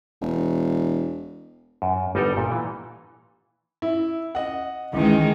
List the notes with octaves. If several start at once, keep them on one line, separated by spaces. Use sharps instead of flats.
E1
F#2
G1 G3 D#4 A4 A#4 D#5
A#2
E3
E4
D#5 F#5
C#2 D#3 E3 G#3